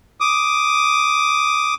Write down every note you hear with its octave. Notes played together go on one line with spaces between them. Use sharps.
D6 D#6